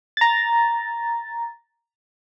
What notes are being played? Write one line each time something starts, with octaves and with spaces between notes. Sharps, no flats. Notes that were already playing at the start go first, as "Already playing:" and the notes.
A#5 A6